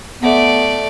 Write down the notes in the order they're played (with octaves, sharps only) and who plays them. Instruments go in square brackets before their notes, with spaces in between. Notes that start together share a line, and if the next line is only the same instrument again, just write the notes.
[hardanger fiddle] A3 D5 [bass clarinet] B3